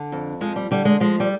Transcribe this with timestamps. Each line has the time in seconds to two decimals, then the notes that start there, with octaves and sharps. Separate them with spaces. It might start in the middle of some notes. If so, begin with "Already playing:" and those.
Already playing: D3
0.12 F2
0.41 F3 G#3
0.56 G3
0.71 D3 G3
0.85 G#3
1.00 F3 G#3
1.20 G3